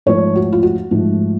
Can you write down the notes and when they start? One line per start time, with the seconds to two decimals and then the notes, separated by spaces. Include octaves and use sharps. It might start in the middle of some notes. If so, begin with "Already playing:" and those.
0.06 G#2 F3 A3 C#5
0.36 F#4
0.52 F4
0.63 F#4
0.91 G#2 F3 A3